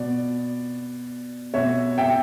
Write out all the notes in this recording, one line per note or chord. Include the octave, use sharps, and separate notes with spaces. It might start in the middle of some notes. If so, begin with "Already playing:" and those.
Already playing: B2 D5
B2 C#5 E5
E5 G5